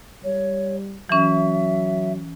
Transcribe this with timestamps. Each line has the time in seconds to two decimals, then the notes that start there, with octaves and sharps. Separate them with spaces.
0.24 G3 C#5
1.09 E3 F#3 C#4 E5